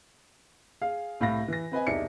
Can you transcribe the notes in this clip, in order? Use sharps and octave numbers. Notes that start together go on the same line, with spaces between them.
G#4 F5
C2 A2 F5 B5 A#6
E3 A#6
C4 B4 D#5 G#5
E1 C2 D#4 D5 E5 C#7